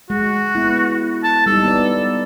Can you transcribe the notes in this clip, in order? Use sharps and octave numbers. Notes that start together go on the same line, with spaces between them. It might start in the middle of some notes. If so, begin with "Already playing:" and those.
G#3 F#4
B3 E4
A5
G3 D#4 A4
B3 D5